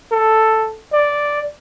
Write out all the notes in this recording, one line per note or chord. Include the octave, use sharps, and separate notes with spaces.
A4
D5